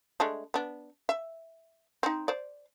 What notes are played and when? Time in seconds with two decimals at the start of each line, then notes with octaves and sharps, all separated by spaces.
0.20 G#3 A3 D4
0.54 B3 D4
1.09 E5
2.03 C4 D#4
2.28 C5 D5